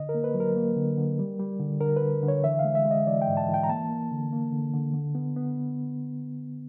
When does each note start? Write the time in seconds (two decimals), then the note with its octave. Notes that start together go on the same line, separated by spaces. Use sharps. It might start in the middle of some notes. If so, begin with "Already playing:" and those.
Already playing: D3 D#5
0.09 A#4
0.14 A#3
0.24 B4
0.34 F#3
0.40 A#4
0.56 A#3
0.77 D3
0.97 D3
1.19 G3
1.40 G3
1.60 D3
1.80 D3 A#4
1.96 B4
2.02 D3
2.23 D3
2.28 C#5
2.44 E3 E5
2.59 F5
2.65 G#3
2.75 E5
2.85 G#3
2.91 D#5
3.07 E3 D5
3.22 G5
3.28 G#2
3.37 A5
3.48 E3
3.54 G5
3.64 A#5
3.69 A#3 A5
3.90 A#3
4.11 D3
4.32 A#3
4.52 D3
4.74 D3
4.94 D3
5.15 B3
5.36 B3